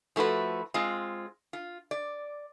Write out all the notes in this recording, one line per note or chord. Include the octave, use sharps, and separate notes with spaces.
F3 A3 E4 F#4 B4
G#3 C4 F4
F4
D5